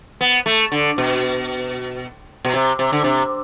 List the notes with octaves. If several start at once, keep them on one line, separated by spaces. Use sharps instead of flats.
B3
A3
D3
B2
B2
C3
C3
D3
C3